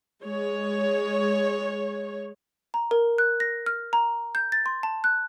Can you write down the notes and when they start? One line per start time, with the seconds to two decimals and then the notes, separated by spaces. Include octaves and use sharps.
0.23 G#3 C#5
2.74 A#5
2.91 A#4
3.18 F#6
3.40 A#6
3.66 F6
3.93 A#5
4.35 G6
4.52 A6
4.66 C6
4.83 A5
5.04 F#6